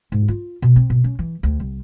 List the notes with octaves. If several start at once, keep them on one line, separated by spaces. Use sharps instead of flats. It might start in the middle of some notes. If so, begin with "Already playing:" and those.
G#2
F4
B2
C4
B2
C#4
E3
D2
C2